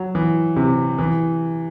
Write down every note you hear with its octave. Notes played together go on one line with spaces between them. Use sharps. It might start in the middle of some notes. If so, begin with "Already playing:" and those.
Already playing: F#3
E3
C3
E3